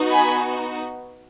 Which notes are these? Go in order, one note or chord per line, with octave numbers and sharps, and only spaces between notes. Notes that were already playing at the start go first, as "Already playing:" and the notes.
Already playing: B3 D#4 F#4
G#5 B5